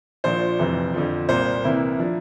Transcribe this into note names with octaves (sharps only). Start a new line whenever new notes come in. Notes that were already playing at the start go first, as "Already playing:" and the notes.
A#1 A#2 F3 C5
F1 F2 C3 E3
F2 D3 F3
C2 A#2 G3 A#3 C5
C2 C3 E3 A#3 E4
F3 A#3 D4